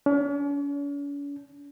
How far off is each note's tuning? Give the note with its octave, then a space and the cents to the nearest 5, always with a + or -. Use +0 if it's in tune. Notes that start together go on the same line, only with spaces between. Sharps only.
C#4 +45